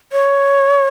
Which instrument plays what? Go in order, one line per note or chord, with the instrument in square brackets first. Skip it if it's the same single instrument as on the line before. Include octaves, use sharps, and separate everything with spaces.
[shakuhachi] C#5